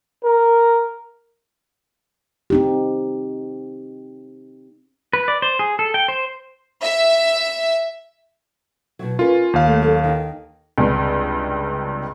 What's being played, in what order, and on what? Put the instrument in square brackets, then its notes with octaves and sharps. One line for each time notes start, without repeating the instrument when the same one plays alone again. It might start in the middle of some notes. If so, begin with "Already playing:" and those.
[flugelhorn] A#4
[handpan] C4 D#4 G4
[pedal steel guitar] B4
D5
C5
G#4
A4
G5
C5
[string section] E5
[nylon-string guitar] B2 F#3
[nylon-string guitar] C#4 A#4 B4 [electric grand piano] F4
[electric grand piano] D#2 F5
[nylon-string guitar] A3
F#3 A4
D#3
[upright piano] C#2 G2 C3